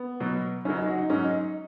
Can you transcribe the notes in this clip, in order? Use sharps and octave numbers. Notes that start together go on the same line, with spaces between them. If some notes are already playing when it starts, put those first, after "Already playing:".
Already playing: B3
B2 F#3
F#2 C#3 F#3 C#4
D#4
F#4
D#4
G#2 F#3 C#4
D#4